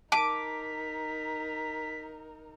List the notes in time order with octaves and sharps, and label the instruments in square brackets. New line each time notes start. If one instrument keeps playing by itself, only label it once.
[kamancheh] D#4 A#4 [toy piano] A5 [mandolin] D6 [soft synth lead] B6